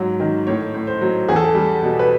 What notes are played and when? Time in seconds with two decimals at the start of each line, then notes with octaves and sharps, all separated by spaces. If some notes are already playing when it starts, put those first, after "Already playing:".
Already playing: G#2 F#3
0.20 D#3
0.47 A2 C#5
0.74 A2
0.87 C5
1.01 F#3
1.28 E2 G#4
1.36 A4
1.44 G#4
1.55 G3
1.83 B2
1.99 B4